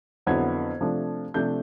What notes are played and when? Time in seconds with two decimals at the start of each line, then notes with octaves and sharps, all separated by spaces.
0.26 F2 D3 F#3 B3 E4 G#6
0.81 C3 F3 A3 D4
1.34 C3 F3 A3 D4 G6